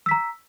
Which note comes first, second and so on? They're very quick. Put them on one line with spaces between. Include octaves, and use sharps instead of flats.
E6 B6 A#5